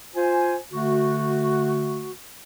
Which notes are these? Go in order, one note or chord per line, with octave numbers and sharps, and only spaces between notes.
F4 C5 G#5
D3 A3 F#4